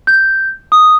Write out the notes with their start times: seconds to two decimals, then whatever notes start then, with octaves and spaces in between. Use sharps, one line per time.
0.07 G6
0.72 D#6